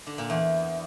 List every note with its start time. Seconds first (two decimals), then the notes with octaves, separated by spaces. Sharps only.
0.07 D3
0.18 A#2
0.30 E2